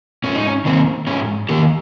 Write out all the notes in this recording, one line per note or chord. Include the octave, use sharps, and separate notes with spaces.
G#2 C#4
D#4
C#4
D#3 A#3 C4
G#2 C#4
D#3 A#3 G4 A#4